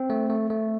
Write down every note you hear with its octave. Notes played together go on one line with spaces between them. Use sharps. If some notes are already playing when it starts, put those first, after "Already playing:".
Already playing: C4
A3
A3
A3